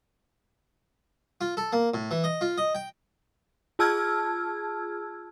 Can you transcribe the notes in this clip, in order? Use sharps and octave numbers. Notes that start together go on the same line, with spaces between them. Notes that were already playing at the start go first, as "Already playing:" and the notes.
F4
A4
A#3
A2
E3
D#5
F4
D#5
G5
F4 G#4 A5 E6 F6 G#6